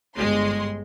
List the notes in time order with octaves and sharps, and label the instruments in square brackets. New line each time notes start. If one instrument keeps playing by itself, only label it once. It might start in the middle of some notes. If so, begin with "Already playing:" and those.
[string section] G1 G#3 C6